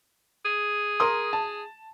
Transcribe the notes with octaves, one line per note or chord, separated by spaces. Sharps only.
G#4
A#4 C6 D#6
A5